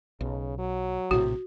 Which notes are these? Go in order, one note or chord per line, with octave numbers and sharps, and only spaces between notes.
B1 C#3
F#3
A#1 A2 C3 F#4